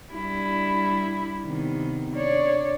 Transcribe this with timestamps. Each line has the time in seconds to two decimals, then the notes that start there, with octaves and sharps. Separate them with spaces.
0.14 G3 D4 E4
1.44 C3 D#3 B3
2.14 D4 C#5 D5